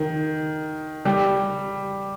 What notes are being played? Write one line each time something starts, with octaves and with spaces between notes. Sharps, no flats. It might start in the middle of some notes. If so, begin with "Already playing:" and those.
Already playing: D#3
G3